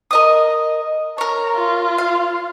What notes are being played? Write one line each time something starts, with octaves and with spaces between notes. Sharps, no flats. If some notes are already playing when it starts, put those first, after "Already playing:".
A#4 D#5 D#6
A#4 C#5 A#5
F4
F5